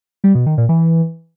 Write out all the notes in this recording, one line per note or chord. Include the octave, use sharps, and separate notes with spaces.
G3
B2
D#3
A#2
E3